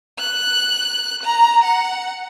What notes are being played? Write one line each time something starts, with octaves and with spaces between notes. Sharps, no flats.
F#6
A#5
F#5